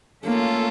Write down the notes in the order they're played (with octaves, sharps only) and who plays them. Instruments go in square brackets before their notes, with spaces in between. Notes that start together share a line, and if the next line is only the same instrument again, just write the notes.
[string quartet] A3 C#4 F4 A4 [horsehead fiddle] A#3